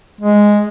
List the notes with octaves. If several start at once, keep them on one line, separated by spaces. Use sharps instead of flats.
G#3